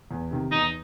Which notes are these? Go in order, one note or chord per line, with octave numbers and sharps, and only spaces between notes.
E2
C3 D#3
E2 D#4